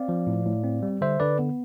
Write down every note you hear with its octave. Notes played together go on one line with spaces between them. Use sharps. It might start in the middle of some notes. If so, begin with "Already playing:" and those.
Already playing: C4 D5 F5
F3
A2
A2
C4
G3
D3 C5 E5
D3 B4 D5
B3